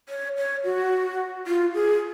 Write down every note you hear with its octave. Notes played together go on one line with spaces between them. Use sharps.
C#5
C#5
F#4
F4
G#4